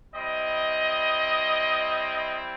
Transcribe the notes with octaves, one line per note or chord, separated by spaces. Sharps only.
G3 C4 E4 D#5